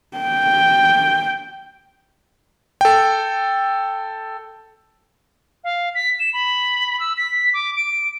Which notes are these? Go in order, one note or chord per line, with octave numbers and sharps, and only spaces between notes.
G5
A4 G5
F5
B6
E7
B5
E6
B6
D6
D7